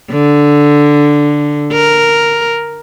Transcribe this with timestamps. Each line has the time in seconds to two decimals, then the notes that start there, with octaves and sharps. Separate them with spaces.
0.11 D3
1.72 A#4